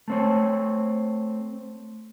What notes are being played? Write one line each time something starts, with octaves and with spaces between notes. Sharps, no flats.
A3 C4 C#5